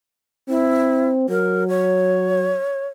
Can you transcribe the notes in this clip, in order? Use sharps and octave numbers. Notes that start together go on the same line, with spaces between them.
C4 E4
F#3 A#4
C#5